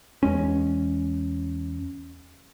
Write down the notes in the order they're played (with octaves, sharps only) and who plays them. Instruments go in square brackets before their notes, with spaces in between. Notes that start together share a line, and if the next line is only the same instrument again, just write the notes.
[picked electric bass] E2 G#3 C#4